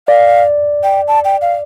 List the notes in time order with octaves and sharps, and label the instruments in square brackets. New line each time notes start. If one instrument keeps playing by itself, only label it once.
[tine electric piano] D5 [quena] F5
[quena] G5
A5
G5
F5